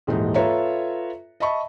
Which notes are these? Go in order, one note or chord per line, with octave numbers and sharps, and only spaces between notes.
D#1 G#2 E3 D#4
F4 A4 B4 C#5 E5 A#5
D#5 E5 A5 B5 C#6